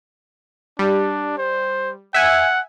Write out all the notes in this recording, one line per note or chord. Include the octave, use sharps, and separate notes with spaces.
G3 D4
C5
E5 F#5 G#5